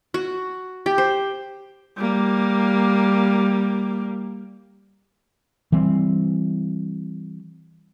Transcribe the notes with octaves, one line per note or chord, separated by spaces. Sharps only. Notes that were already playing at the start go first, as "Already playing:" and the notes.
F#4
G4
C5
G3 A#3
E3 G3 C4